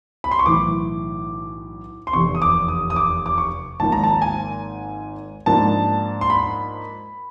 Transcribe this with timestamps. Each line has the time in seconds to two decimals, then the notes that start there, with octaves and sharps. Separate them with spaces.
0.24 B5
0.31 C6
0.39 C#6
0.46 B1 A2 E3 D6
2.07 C6
2.13 F1 E2 C3 C#6
2.35 D#6
2.42 D6
2.68 D#6
2.90 D#6
2.96 D6
3.26 D6
3.38 C#6
3.80 G#1 G#2 F3 A#3 A5
3.92 A#5
4.04 A5
4.22 G#5
5.46 G#2 F3 A#3 D4 A5
6.21 C6
6.30 B5